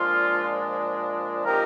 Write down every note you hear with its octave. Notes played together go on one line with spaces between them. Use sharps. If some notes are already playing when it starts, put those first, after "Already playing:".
Already playing: A#2 F3 G#3 D4 F4
F3 C4 D#4 G4 A#4